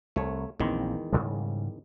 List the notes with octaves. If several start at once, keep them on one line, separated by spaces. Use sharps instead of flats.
C2 A3 C#5
A#1 E2 D#3 G#3 A#3 C4
G#2 C#3 G3